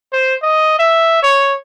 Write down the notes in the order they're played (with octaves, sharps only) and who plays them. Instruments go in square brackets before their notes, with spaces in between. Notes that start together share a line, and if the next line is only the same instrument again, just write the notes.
[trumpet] C5
D#5
E5
C#5